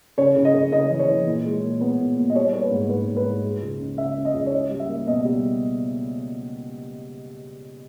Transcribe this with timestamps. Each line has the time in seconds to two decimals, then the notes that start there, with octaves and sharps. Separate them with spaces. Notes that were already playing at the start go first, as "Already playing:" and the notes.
0.18 C#3 C#5
0.36 C#3
0.45 D#5
0.54 C#3
0.72 C#3 D#5
0.90 E3
0.99 C#5
1.08 E3
1.26 A#2
1.45 G#3
1.63 A#2
1.81 B3
1.99 A#2
2.17 A#2
2.30 D#5
2.35 G3 C#5
2.53 A#3 C#5
2.63 B4
2.71 G#2
2.89 G#2 B4
3.08 G#2
3.16 B4
3.26 G#2
3.44 G#3
3.62 C#2
3.80 C#3
3.98 C#3 E5
4.16 C#4
4.25 D#5
4.34 C#2
4.46 C#5
4.52 C#4 D#5
4.71 G3
4.80 E5
4.88 A#3
5.07 B2 D#5
5.25 G3